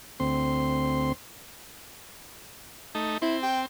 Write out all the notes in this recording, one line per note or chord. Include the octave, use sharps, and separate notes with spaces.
D2 C4 C6
A3 D#4
C4 E4
G5